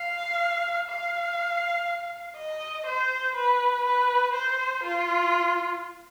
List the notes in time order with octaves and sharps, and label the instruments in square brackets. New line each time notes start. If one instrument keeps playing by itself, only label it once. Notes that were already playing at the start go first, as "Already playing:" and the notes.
Already playing: [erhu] F5
F5
D#5
C5
B4
B4
C5
F4